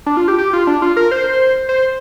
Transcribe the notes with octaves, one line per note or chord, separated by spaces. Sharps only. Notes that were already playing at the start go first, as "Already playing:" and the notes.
D4
F4
G4
G4
F4
D4
F4
A#4
C5
C5